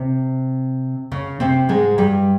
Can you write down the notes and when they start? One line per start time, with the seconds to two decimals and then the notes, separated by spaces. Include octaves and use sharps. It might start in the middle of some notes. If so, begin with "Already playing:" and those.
Already playing: C3 C4
1.12 C#3 C#4
1.40 C3 C4
1.69 G#2 G#3
1.98 G2 G3